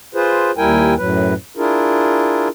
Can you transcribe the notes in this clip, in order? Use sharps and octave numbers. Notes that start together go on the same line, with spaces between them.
F4 G#4 B4 C5
D#2 G3 E4 A#4 G5 G#5
F#2 A2 F#3 B4
D4 E4 F4 G#4 A#4